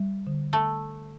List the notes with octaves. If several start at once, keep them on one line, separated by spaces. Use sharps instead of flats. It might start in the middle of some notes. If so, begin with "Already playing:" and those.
Already playing: G3
D3
A3